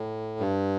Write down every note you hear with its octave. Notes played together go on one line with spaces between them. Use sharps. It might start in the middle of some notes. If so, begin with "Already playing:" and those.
Already playing: A2
G2